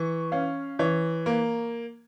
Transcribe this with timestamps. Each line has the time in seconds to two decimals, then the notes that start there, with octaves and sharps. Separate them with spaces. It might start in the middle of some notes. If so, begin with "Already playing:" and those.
Already playing: E3 C#6
0.32 C#4 F5
0.79 E3 C#5
1.26 A#3